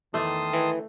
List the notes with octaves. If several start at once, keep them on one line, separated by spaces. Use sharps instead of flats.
E2 D#3 A3 A5 C6 D#6
E3